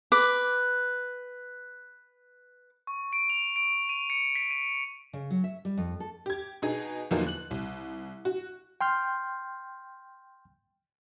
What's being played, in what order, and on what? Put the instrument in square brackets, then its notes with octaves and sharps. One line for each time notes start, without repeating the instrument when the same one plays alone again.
[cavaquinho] B4 D6
[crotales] C#6
D7
F7
D7
D#7
C#7
B6
D#7
[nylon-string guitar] C#3
F#3
E5
G3
F2
A4
[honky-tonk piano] G4 G#6
B2 D#4 G#4
E2 D3 F3 F#3 A#3 D#4
F#6 F#7
C2
F#4
[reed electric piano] G5 C6 F6 G6